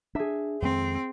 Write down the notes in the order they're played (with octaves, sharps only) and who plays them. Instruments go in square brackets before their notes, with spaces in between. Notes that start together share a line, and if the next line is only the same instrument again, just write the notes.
[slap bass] D4 [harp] G#4 E5
[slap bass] F2 D#3 G#3 [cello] C4